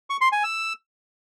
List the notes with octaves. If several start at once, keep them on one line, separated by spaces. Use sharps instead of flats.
C#6
C6
G#5
E6